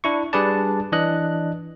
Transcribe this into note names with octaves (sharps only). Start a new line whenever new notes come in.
D4 E4 C#6
G3 D4 G#4 B4 D5 A5
E3 D4 D#5 F#6